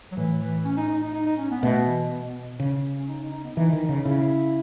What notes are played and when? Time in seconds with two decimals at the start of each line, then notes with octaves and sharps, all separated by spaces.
0.12 F#3
0.17 A2 E3
0.41 E3
0.64 C#4
0.77 D#4
0.89 D#4
1.02 D#4
1.14 D#4
1.26 D#4
1.38 C#4
1.51 B3
1.62 B2 A3
1.86 E3
2.60 C#3
2.99 C#4
3.08 D#4
3.20 D#4
3.32 D#4
3.44 B3
3.57 E3 D#4
3.73 D#3
3.82 D#4
3.89 C#3
4.05 C#3 E4